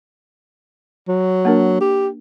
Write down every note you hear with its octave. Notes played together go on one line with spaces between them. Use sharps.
F#3
A#3 D4 A#4
G4